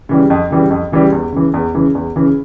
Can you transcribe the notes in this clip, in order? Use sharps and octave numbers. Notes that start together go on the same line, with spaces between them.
C#3 E3 G3
F2
C#3 E3 G3
F2
C#3 E3 G3
E2
C#3 E3
E2
C#3 E3
E2
C#3 E3